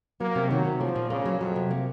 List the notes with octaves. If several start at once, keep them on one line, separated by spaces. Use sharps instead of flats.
F#3 A#3
C3
D#3 F#3
C3
F3 A#3
A#2
C#3 A#3
F#3
F2 F#3
C3
A#3